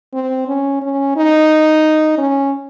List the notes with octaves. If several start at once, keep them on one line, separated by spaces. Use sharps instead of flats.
C4
C#4
C#4
D#4
C#4